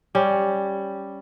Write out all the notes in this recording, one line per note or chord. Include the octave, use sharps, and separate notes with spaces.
G3 C#4